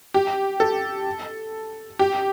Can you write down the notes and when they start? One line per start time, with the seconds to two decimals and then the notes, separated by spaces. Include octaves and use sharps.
0.14 G4
0.60 A4
1.99 G4